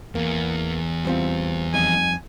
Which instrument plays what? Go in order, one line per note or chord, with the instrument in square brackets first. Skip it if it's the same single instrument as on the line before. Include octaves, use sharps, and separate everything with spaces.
[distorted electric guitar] E2 [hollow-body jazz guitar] A#3
[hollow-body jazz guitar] G3 C4 F4
[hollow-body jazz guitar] F2 G3 D#4 [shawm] G#5